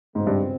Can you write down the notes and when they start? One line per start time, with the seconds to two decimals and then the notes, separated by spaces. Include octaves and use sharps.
0.15 C#2 G#2 B2 G#3 C4
0.26 G2